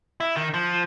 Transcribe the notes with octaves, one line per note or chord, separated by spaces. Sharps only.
E4
D#3
F3